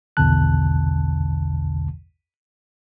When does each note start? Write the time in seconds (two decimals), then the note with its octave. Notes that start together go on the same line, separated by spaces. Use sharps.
0.17 A#1 E2 B2 D3 A5 F#6